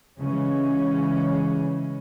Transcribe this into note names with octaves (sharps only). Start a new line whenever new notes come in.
C#3 E3 G#3 C#4